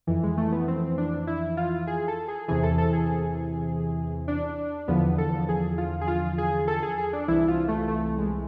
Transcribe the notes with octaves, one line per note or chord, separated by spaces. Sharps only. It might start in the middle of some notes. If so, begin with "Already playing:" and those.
F2 E3
G#3
A3
B3
C4
D4
E4
F4
G#4
A4
G#4
E2 C3 E3 G#4
A4
A4
G#4
D4
E2 D3 F3 B3
A4
G#4
F4
G#4
F4
G#4
A4
G#4
G#4
D4
C2 C3 E3 E4
F4
A3
A3
G#3